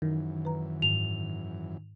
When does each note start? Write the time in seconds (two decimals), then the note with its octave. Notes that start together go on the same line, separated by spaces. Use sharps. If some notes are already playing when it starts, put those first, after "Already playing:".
0.02 F#2 D#3 E3
0.45 B4 A#5
0.82 G#2 F7